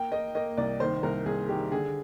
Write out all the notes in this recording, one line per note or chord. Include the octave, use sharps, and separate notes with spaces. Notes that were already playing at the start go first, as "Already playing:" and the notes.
Already playing: A#3 G5
A#3 D#5
A#3 D#5
C2 D5
D#3 C5
C2 A#4
C2 G#4
D#3 G4
D3 G#4